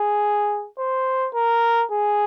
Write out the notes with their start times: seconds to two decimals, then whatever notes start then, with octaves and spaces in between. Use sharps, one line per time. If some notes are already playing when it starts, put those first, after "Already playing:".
Already playing: G#4
0.79 C5
1.34 A#4
1.91 G#4